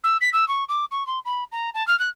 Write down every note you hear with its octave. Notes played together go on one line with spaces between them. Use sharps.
E6
B6
E6
C#6
D6
C#6
C6
B5
A#5
A5
F6
F#6